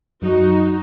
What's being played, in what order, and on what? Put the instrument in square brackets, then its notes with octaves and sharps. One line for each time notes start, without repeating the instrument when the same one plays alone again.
[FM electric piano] F#2 F#3 [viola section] D#4 F#4